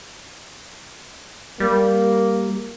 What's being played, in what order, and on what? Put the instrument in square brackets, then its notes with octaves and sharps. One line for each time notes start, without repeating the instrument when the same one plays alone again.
[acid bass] G3 [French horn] A#3